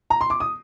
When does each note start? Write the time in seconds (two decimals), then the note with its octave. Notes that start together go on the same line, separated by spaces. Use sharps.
0.10 A#5
0.21 C6
0.30 D6
0.40 D#6